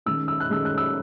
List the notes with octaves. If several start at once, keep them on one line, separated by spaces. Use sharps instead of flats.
D#3 G#3 C#4 E6
E6
F#6
D#3 G#3 C#4 E6
F#6
E6